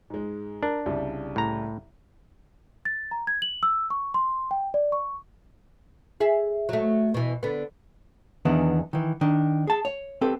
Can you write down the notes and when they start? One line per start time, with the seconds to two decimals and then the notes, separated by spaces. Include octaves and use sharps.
0.10 G#2 G#3
0.63 D4 A#4
0.86 C2 C#3 G3
1.36 A2 A#5
2.85 A6
3.11 A#5
3.27 G#6
3.42 F#7
3.63 E6
3.90 C#6
4.14 C6
4.51 G5
4.74 D5
4.92 C#6
6.20 G#4 E5
6.69 F#3 A3
7.14 B2 E3
7.43 D3 B3
8.45 E2 D#3 E3 B3 D4
8.93 D#3 E3
9.21 D#3 D4
9.67 G#4 A5
9.85 C#5
10.21 C4 G4 A4 B4